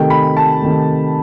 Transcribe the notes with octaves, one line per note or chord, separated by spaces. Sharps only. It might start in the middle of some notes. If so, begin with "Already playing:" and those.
Already playing: C3 D#3 A3 G5
B5
A5
C3 D#3 A3